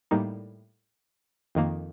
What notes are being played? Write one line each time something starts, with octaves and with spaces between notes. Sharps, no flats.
A2 G3 A#3 D#4
F2 D#3 A#3